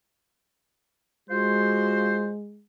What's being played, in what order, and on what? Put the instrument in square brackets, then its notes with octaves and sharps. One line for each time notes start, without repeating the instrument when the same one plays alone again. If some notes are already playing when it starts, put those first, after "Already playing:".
[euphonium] G#3 [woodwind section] F4 F#4 C5